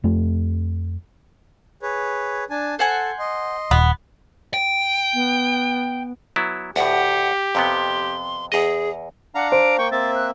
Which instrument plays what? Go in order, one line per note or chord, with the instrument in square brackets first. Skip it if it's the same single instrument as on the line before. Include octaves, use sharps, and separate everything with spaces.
[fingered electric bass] F2 A3
[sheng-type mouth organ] G#4 B4 C#5
D4 G#5 A5
[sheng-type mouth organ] A4 [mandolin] C5 F#5 G#5
[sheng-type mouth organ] D#5 C6
[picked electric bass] D#1 [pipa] B3
[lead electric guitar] G5
[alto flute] B3
[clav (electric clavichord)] F#3 B3 E4
[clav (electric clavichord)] D2 A2 [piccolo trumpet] G4 [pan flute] F#5
[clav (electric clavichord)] F2 C3 B3 [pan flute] C6
[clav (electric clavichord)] E2 D#5 [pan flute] G#4
[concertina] D4 F5 A#5 [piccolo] F#5
[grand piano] C5 [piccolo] D7
[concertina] A#3 G5 [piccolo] C#6
[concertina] A#3 C4 E5 [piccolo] A6
[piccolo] F#6